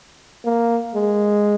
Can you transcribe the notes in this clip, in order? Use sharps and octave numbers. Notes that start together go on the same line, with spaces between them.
A#3
G#3